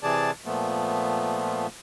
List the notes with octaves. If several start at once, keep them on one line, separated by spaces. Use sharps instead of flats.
C3 E3 G#4 D5 A5
A#2 F3 A3 B3